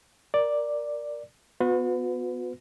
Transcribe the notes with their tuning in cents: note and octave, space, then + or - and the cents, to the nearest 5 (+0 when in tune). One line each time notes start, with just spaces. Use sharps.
A#4 +10 D5 +0
B3 +10 F#4 -40 B4 +30